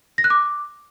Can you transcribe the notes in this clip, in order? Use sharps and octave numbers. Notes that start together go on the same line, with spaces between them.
A#6
F#6
D6